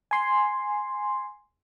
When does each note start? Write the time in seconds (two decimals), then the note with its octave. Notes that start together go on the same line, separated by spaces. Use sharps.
0.11 G#5 C6